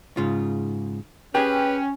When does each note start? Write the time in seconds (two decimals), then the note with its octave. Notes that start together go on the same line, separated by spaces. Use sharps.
0.17 G#2 C#3 F4
1.35 C#4 G4 G#4 B4 G5